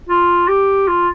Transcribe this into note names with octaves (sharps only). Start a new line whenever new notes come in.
F4
G4
F4